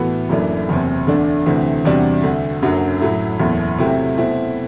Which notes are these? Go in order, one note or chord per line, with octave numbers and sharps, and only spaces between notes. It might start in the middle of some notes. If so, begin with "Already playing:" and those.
Already playing: A2 E3 B3 F#4 A4
F#1 F#2 E3 A3 D4
F#1 E2 C3
E2 D3 A3 D4
D2 C3 E3 A3 C4
E2 C3 G3 D4 F#4
D2 D3 A3
F#1 F#2 D3 F#3
A2 F#3 A3 E4
F#1 E2 B2 A3 E4
C3 F#3 A3 E4 G4
B2 A3 C4 E4